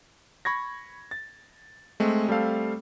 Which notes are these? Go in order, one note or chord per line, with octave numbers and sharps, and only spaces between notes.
B5 C#6 G#6 A#6
A6
G#3 A3 C4
G3 A3 C4 A4 F5